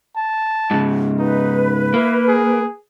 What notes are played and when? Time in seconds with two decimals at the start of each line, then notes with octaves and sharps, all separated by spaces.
0.16 A5
0.71 G#2 C#3
1.19 D#4 B4
1.94 A#3 E4
2.28 G#4